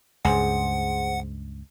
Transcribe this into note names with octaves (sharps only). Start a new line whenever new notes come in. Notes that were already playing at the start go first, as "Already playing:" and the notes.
C#2 G2 G#4 C5 F#5